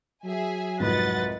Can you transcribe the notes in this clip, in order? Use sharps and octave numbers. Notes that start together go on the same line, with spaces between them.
F#3 G#4 E5 G#5
C2 F2 G#2 B4 D#5 F#5 A6